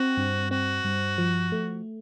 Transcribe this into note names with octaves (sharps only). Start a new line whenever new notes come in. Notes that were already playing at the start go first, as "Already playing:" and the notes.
Already playing: C4 F#4
G2
C4 F#4
G2
F3
A3